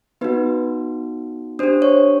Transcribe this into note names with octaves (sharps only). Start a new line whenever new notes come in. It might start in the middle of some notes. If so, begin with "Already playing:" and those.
B3 D#4 F#4 B4
D4 G4 C5
C#5